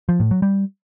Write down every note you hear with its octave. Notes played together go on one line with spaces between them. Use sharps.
F3
A2
F#3
G3